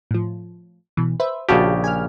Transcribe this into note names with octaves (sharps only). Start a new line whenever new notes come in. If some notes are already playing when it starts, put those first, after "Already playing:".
A2 F3
B2 E3
B4 C5 E5
A#1 C#3 F#4 G4 F5 A5
G#5 F6